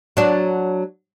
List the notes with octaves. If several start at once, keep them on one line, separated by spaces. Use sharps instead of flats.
F#3 D4